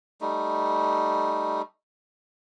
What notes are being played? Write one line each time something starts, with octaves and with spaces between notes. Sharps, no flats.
G3 A3 D#4